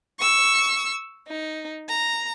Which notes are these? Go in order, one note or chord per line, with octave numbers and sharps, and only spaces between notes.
C#6 E6
D#4
A#5